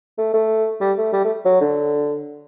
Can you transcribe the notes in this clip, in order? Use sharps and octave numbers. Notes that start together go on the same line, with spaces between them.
A3
A3
G3
A3
G3
A3
F#3
D3